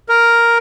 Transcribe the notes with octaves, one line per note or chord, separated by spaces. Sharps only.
A#4